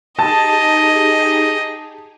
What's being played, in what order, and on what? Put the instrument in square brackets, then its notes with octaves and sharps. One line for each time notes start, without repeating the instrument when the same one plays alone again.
[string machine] D#4 G4 G#4 [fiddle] D#5 [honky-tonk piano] A5